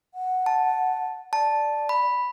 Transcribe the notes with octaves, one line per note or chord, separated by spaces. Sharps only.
F#5
A5
D5 A5
B5